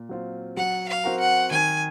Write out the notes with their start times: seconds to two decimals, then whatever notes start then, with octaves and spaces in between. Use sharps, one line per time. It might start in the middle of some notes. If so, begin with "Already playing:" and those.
Already playing: A#2
0.09 F#3 C4 F4
0.57 F#3 F#5
0.89 F5
1.04 C4 F#4 A#4
1.20 F#5
1.51 D#3 G#5